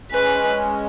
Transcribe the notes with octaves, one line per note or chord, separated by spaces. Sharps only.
G#3 C#4 B4